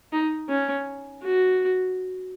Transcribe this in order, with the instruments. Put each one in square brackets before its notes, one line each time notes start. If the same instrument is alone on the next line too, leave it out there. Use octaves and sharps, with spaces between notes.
[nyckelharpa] D#4
C#4
F#4